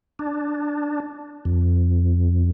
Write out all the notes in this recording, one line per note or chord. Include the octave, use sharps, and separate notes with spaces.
D4
F2